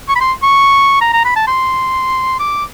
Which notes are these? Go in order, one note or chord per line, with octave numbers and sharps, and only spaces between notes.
C#6
B5
C6
C#6
A#5
A#5
B5
A5
C6
D6